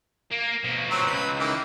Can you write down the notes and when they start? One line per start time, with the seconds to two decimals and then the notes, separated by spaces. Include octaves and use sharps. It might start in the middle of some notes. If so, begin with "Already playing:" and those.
0.31 A#3
0.64 B2 F3
0.91 F#3 C4 C#5
1.06 C#2 B4
1.39 D#3 E3 A#3